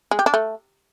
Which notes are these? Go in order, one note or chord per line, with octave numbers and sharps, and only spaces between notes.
G#3
G4
D4
A3